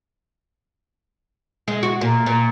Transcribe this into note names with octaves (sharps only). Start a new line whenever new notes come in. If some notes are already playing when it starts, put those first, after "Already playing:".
G#3
F#4
A#2
A#2